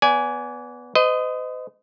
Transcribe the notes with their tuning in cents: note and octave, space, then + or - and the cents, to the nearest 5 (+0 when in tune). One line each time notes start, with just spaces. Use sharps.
B3 +0 D5 -30 G#5 +5
C5 -45 D#5 +0